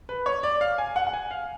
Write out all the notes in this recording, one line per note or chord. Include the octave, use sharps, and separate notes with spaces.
B4
C#5
D5
F5
G#5
F#5
F#5
G#5
F5